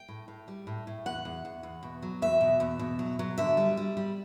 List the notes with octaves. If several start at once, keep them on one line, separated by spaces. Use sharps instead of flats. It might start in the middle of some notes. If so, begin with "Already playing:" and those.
Already playing: G5
A2
A2
G3
A2
A2
E2 F#5
E2
E2
E2
B2
F#3
E2 E5
B2
E2
B2
F#3
F#3
D3 E5
G3
G3
G3